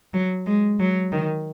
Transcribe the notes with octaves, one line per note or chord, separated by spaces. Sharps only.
F#3
G#3
F#3
D#3